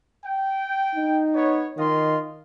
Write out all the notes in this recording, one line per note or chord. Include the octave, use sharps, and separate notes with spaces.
G5
D#4
B3 C#5
D#3 F4 D#5 C6